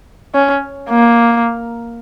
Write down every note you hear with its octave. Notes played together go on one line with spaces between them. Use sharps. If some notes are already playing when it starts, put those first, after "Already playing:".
C#4
A#3